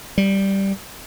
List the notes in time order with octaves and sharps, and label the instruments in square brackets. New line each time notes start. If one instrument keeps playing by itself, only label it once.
[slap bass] G3